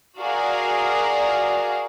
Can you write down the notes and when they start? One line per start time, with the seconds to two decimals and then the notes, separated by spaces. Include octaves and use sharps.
0.19 F#4 G#4 A#4 D5 F5